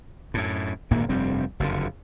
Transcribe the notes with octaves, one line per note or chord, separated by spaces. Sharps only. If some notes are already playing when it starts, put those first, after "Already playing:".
F#2 A2
G#1 D2 A#2 A#3
F1 G2 G3 C4
F#1 F2 D3